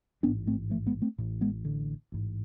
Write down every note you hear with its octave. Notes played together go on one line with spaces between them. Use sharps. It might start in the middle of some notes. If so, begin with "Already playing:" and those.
A1 G#2 B3 D4
A3 C4
F3 A3
G#3 B3
A3 C4
A1 A2
G#3 B3
D3
A1 G#2